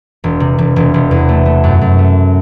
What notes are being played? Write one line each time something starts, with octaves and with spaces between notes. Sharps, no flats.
E1
C3
E1
E1
E1
E2
A3
A3
F#2
F#2
A3